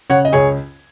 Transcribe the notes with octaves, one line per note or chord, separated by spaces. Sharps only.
C#3 C#5 F#5
D#5
C#2 G#4 C#5